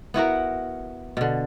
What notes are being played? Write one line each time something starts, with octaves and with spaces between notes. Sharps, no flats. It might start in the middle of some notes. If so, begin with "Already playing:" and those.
B3 E4 F#4 A#4
B2 D3